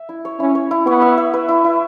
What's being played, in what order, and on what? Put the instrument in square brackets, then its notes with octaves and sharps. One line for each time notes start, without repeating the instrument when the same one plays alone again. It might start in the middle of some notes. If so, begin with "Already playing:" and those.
Already playing: [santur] E5
E4
C#5
[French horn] C#4 [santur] E4
[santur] C#5
E4
[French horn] B3 [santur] C#5
[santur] E5
E5
B4
E4
E4